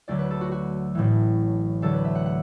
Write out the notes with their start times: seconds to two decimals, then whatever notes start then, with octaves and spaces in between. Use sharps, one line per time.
0.08 D2 D3 F#3 D5
0.19 B4
0.30 A4
0.41 F#4
0.52 F#4
0.95 A1 A2 E3
1.82 D2 D3 F#3 A4
1.94 B4
2.05 E5
2.15 F#5
2.26 F#5